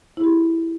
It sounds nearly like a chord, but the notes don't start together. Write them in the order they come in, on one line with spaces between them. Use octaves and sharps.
E4 G#4 G4